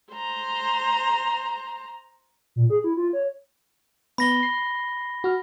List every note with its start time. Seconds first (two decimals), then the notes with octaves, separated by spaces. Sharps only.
0.13 C5 A#5
2.56 A#2
2.70 G#4
2.84 E4
2.97 F4
3.13 C#5
4.18 B3 B5 A#6 G7
4.43 C7
5.24 F#4 F6